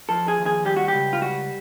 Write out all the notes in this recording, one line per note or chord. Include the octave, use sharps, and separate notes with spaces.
F3 A4
G#4
D#2
G#4
G3 G4
F#4
G4
C#2
F4
G3 F#4